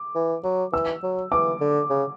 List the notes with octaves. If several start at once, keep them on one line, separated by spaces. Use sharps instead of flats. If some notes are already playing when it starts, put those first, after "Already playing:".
Already playing: D6
E3
F#3
E3 E6
F#3
E3 D6
D3
C#3